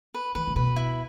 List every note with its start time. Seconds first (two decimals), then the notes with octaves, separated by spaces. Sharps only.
0.14 B4
0.35 E3 B4
0.47 C#3
0.56 B2 B4
0.76 E4